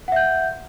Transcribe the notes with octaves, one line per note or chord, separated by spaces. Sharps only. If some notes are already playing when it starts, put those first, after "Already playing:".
E5 F#5 G6